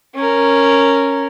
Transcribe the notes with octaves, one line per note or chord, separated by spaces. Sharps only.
C#4 A#4